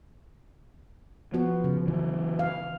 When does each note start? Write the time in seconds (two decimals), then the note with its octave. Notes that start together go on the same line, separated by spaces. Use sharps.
1.34 F3 B3 F#4
1.64 C#3
1.88 E3 F#3
2.39 F5